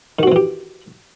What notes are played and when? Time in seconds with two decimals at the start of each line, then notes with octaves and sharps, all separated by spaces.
0.19 D#3
0.23 F#4
0.27 C4
0.32 E3
0.36 G4